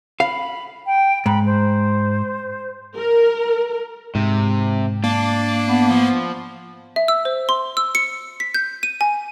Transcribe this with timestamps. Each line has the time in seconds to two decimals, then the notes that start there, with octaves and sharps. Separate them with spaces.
0.20 F5 B5
0.86 G5
1.26 G#2 B5
1.46 C5
2.97 A#4
4.15 G#2 C3
5.04 A#3 D4
5.68 B3
5.90 F3
6.96 E5
7.08 E6
7.25 C5
7.49 C6
7.77 E6
7.95 C#7
8.40 B6
8.54 G6
8.83 D#7
9.01 G#5